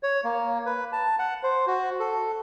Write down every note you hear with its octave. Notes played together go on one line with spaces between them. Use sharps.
C#5
A#3
B4
A5
F#5
C5
F#4
A4